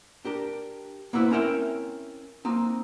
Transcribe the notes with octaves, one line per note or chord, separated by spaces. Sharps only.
D4 G4 A#4
A#3 B3 E4 B4 C5
C4 C#4 E4 A#4 E5 G5
A#3 C4 D#4